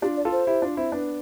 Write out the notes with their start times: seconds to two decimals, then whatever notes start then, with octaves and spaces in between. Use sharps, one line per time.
0.02 D4 F4 G4
0.17 D5
0.25 F4 A4
0.32 C5
0.47 E4 G4
0.62 D4 F4
0.77 C4 E4
0.92 B3 D4